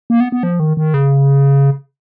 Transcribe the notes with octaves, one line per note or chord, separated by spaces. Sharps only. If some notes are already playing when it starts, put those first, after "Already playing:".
A#3
B3
B3
F3
D#3
D#3
C#3